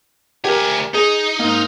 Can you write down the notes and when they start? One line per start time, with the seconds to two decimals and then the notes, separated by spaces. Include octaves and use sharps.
0.45 D2 G4 A#4 G#5
0.94 D#4 G#4
1.39 G#2 A#3